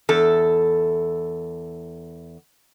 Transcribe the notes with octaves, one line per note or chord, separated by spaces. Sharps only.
E2 A4